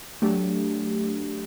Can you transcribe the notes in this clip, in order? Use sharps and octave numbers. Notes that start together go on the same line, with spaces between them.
F#3 A3 D4 G4